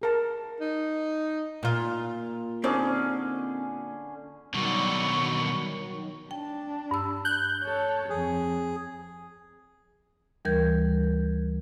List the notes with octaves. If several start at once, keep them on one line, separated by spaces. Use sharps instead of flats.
G#4 A#4 A5
D#4
A#2 F4
D3 C4 C#4 D#4 G#4 D5
B2 D3 D#3 F#3 G3 C#6
D4 G5
G2 E6
F#6 G6
A4 C#5
F2 G#4
D2 E3 G3 A#4 G6 G#6